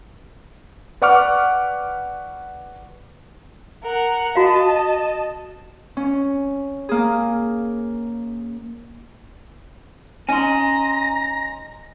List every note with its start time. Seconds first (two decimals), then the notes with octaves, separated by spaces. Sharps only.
1.02 B4 D5 F#5 C#6 D6 F6
3.83 A#4 F#5
4.36 F#4 D#5 F5 A5
5.97 C#4
6.89 A#3 G#4
10.29 C#4 D#4 G#5 A#5 C6